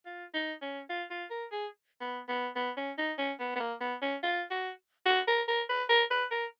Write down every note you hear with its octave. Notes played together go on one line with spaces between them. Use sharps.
F4
D#4
C#4
F4
F4
A#4
G#4
B3
B3
B3
C#4
D#4
C#4
B3
B3
A#3
B3
C#4
F4
F#4
F#4
A#4
A#4
B4
A#4
B4
A#4